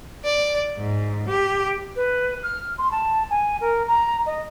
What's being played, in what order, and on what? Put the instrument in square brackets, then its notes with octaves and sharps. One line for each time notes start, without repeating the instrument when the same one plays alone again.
[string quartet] D5
G#2
G4
[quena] B4
F6
C6
A5
G#5
A#4
A#5
D#5